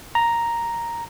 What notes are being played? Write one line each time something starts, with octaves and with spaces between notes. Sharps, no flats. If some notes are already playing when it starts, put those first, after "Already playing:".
A#5